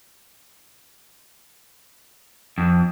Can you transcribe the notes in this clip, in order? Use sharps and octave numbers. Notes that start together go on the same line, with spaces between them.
F2